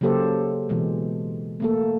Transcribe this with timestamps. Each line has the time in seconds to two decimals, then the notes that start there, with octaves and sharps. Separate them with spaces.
0.01 C#3 F#3 A#3 G4 A4 C5
0.69 B2 E3 G#3
1.60 A3 A#3 A4